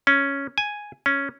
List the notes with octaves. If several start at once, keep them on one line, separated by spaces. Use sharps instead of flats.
C#4
G#5
C#4